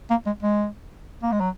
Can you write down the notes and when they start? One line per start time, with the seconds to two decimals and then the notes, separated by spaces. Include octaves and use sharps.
0.10 A#3
0.26 G#3
0.43 G#3
1.23 A#3
1.32 G#3
1.41 F#3